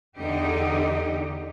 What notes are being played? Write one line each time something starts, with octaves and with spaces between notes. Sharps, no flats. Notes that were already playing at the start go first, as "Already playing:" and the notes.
E2 D3 D#4 G4 D#5